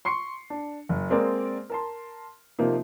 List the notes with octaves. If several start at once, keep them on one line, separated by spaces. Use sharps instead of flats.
C6 C#6 C7 C#7
D4
F#1
G#3 A#3 C4 G#4 A#4 D5
A#4 A5 C6
C3 F3 A#3 D#4